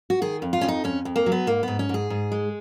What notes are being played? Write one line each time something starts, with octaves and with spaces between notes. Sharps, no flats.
F#4
D#3 G#4
F2
F4
F2 C#4
D#4
F2 C#4
F2
A#3
F#3
B3
G#2 A#3
G#2 B3
C#4
G#2 G#4
G#2
G#3